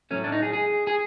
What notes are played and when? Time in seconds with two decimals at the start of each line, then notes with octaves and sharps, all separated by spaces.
0.11 A2 F#3 A3 C#4
0.24 D4
0.32 D#4
0.42 G#4
0.53 G#4
0.87 G#4